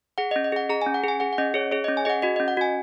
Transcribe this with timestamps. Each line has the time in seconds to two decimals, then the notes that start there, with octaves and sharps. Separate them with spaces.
0.18 G#4 F#5
0.31 D#5
0.36 C#4
0.44 D#5
0.52 G#4 F#5
0.70 G#4 A#5
0.82 G#5
0.86 C#4
0.94 F#5
1.04 G#4 G#5
1.20 G#4 F#5
1.33 F#5
1.38 C#4 D#5
1.54 G#4 C#5
1.71 G#4 C#5
1.84 D#5
1.88 C#4
1.97 G#5
2.05 G#4 D#5 F#5
2.22 F#4 D#5
2.36 C#4 D#5
2.48 F#5
2.57 F#4 G#5